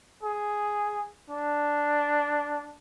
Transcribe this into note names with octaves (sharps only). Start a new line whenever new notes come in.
G#4
D4